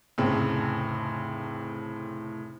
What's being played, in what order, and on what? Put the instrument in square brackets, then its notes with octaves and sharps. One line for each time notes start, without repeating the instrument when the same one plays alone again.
[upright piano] F1 A2 C#3 C4